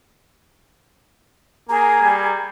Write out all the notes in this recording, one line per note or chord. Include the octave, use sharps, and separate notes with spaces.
A#3 G#4 A#5
G3